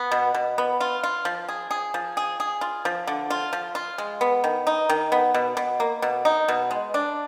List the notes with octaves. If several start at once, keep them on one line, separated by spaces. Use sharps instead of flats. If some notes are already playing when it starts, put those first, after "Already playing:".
Already playing: B3
B2
B2
B3
F4
F4
F3
G#4
G#4
F3
G#4
G#4
F4
F3
D3
F4
F3
F4
G#3
B3
D#3
D#4
D#3
B3
B2
B2
A#3
B2
D#4
B2
G#3
D4